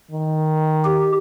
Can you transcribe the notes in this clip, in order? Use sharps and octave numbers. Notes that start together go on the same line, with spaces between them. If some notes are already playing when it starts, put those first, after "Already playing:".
D#3
G4